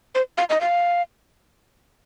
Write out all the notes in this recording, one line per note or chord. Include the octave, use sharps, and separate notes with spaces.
C5
F5
D#5
F5